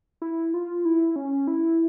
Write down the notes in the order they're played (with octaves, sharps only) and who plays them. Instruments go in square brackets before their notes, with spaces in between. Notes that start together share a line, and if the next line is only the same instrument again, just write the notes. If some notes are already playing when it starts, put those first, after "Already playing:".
[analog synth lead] E4
F4
E4
C#4
E4